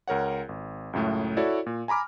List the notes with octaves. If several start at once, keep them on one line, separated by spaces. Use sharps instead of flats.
C#2 A#4 C#5 F#5
G#1
C#2 F#2 A2 A3
E4 F#4 A4 C#5 D5
A#2
G#5 A#5 B5 D6 F6